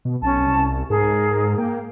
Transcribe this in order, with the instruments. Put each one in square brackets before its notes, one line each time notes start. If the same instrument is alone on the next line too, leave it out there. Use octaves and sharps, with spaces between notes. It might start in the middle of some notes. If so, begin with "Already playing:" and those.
[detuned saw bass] B2
[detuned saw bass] B1 [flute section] C#4 A5
[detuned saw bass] C2
[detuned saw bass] G#2 [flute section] G#4 A#4
[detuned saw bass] A#3 [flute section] G5